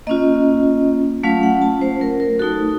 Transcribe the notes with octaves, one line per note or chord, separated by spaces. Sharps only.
A#3 C#4 F4 D#5
F#3 A3 C#4 F4 F5
F#5
A5
C5
A#4
A#4
A3 D#4 F#4 A4